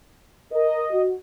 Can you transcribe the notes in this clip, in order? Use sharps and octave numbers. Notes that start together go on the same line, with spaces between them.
A#4 D#5
F#4